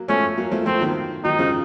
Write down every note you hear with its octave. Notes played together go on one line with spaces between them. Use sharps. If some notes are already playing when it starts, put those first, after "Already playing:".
Already playing: F#3 A#3
F3 A3 C#4
F#3 A#3
F3 A3
F3 A3 C4
D#3 F#3
D#3 F#3 D#4
C#3 F3